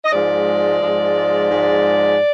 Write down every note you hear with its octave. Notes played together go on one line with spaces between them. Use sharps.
D#5
G#2 F3 G#3 D5
G#2 F3 G#3
G#2 F3 G#3